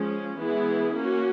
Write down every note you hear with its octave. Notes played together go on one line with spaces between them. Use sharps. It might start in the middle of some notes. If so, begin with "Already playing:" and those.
Already playing: F3 G#3 C#4
E3 G#3 B3 E4 G#4
A#3 C#4 F#4